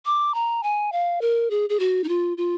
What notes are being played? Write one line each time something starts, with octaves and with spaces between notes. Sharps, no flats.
D6
A#5
G#5
F5
A#4
G#4
G#4
F#4
D#4
F4
F4